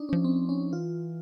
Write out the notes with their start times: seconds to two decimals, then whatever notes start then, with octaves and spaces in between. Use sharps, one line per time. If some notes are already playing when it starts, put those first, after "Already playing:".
Already playing: D4 D#4
0.09 F3 C#4
0.24 C4
0.49 C#4
0.72 E3 F4